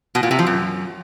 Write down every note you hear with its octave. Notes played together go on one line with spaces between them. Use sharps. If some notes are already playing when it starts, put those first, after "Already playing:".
B2
A#2
C3
F3
F#2